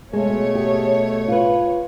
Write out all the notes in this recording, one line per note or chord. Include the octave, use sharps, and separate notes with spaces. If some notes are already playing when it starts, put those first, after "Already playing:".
B2 G#3 A3 C#5
G4 G#4
F4 B4